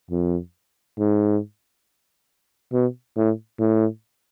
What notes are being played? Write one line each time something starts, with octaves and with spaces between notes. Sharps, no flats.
F2
G#2
B2
A2
A2